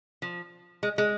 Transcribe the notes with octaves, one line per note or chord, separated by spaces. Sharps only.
F3
G#3
G#3